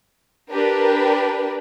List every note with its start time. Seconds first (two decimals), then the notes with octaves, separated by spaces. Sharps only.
0.52 D4 G4 A#4 B4